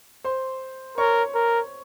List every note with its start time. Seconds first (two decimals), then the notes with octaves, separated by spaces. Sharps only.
0.24 C5 C6
0.98 A#4 C#5 C#6
1.35 A#4